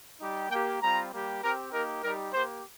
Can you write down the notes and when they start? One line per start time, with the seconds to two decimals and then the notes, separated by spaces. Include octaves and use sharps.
0.20 G3 D#4 G4
0.50 A#3 G5
0.55 G4
0.80 G3 C4 F4 A#5
1.11 G3 A#3 G4
1.42 C4 G4 A#4
1.72 A#3 D#4 G4 A#4
2.02 G3 D#4 G4 A#4
2.32 A#3 G4 C5